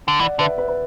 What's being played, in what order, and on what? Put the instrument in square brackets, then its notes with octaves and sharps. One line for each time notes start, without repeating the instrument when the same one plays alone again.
[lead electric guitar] D3
[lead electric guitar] E3 [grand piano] D5 F#5
[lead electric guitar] D3 [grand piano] B4 E5
[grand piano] B4 E5
B4